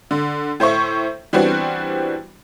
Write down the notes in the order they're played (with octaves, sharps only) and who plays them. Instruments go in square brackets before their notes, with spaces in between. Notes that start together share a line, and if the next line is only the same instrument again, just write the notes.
[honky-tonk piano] D3
A2 C5 E5 C#6
E3 G3 B3 C4 D4 F#4